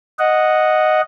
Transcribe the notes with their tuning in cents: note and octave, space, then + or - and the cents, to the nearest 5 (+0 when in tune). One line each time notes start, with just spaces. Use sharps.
D#5 +0 F#5 -5